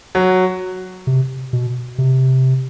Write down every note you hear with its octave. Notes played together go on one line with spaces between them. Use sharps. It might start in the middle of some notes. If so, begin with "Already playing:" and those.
F#3
C3
B2
C3